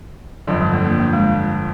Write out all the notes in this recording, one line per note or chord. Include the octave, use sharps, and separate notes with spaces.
G1 F2 D3 F#3
G3
A3
A#3
A#3
G#3